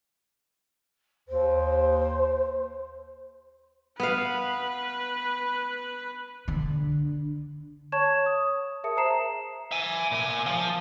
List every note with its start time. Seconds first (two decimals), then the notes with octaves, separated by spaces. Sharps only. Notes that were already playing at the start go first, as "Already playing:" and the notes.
1.28 D#2 C5
4.00 B3 B4 F5
6.48 D3
7.92 C#5 A5 C#6 G#6 E7
8.26 D#6
8.84 G#4 A#4 E5 A5 D#6 C#7
8.97 C5 E5 A5 A#5 C7 E7
9.71 E5 G#5
10.12 A#2 G#5
10.46 F3 F4